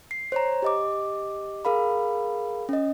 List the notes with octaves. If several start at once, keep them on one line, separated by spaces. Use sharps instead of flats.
C7
C5 C#5 A#5
G4 D#5 D6
G#4 A#4 F5 B5
C#4 D#5